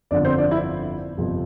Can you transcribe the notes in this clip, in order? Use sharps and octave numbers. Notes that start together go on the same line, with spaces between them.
G1 F2 D3 F3 D4 D5
C4 C5
D4 D5
E4 E5
G1 F2 C3 F3